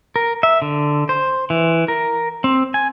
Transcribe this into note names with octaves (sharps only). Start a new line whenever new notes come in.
A#4
E5
D3
C5
E3
A#4
C4
G#5